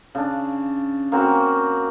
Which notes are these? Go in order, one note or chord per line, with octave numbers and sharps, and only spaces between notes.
C#3 D4
A#3 C4 C#4 F#4